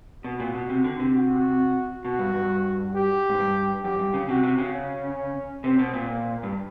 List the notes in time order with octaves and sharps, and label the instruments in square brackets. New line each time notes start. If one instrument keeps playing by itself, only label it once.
[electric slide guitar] B2 [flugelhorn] F#4
[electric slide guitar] A#2
B2
C3
D3
C3
[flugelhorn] F#4
[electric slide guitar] B2 [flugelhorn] F#4
[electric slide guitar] G2
G2
[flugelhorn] G4
[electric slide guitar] G#2
G2
[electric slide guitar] F#2 [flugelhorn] G4
[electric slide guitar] G2
C#3
[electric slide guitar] C3 [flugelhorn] F#4
[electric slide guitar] C3
C#3
[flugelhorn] C#4
[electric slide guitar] C3 [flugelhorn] C4
[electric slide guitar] B2
A#2
[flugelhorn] A#3
[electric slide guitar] G2